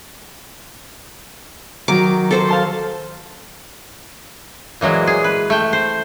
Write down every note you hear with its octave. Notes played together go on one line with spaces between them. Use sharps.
D#3 F#3 D6
A4 C5
F5 A5 C6
A#2 E3 F#3 G#3
G#4
B4
A3 G5
C5